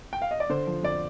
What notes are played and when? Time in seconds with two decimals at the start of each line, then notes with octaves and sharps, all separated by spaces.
0.13 G5
0.22 F5
0.31 D#5
0.40 D5
0.50 D3 C5
0.67 F3
0.83 F2 D5